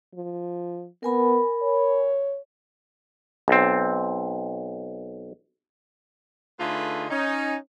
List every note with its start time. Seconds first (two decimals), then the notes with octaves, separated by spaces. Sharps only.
0.15 F3
1.03 B3 A#4 G#5 B5
1.62 C#5
3.48 B1 C4
6.60 D3 A3 D#4 F4 G#4 B4
7.11 C#4 D#4